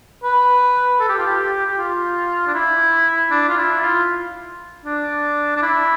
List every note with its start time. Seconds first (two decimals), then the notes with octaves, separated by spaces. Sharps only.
0.24 B4
1.00 A4
1.09 G4
1.18 F4
1.26 G4
1.66 G4
1.77 F4
2.47 D4
2.54 E4
3.31 D4
3.49 F4
3.57 E4
3.82 F4
4.85 D4
5.56 D4
5.62 E4